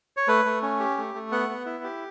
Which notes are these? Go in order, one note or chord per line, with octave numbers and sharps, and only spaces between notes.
C#5
A3 B4
A3
C#4
G4
A3
A3
B3 F#5
B3
E4
G4